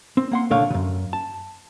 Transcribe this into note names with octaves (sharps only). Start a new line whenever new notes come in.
C4
A#3 F#5 C6
C2 A#2 D3 A3 C#5 F5
F#2 C#3
A5